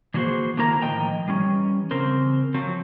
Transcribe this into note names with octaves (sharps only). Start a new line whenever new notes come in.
E3 F#3 A#3 F#4 G#4 C5
D3 D#3 A#3 E4 A#4 A#5
A2 D#3 F3 D#5 G5 A#5
E3 G3 C#4
C#3 C4 A#4 C5
F3 F#3 C4